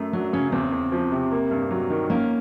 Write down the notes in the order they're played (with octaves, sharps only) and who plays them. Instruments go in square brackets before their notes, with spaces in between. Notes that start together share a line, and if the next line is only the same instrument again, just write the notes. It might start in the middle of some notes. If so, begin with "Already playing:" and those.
Already playing: [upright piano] F#2 A3
[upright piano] F#3 [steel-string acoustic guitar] D4
[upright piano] C#3 [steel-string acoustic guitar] C#4
[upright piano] E2 [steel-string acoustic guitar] C4
[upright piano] E2
F3
C3
A#3
G2
F#3
D#3
[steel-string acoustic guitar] A#3 [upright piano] C#4